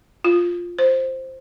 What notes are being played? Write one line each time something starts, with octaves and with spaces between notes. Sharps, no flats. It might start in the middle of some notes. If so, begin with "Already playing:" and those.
F4
C5